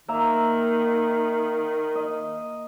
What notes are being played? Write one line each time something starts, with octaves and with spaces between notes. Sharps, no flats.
D#3 A#3 E5 A#5
D#5